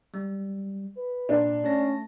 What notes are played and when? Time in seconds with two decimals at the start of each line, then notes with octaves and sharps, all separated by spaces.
0.14 G3
0.97 B4
1.29 A#2 D4
1.64 A3 C#4 A5 A#6